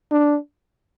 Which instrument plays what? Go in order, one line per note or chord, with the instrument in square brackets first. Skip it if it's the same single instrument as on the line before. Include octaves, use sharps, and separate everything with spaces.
[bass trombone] D4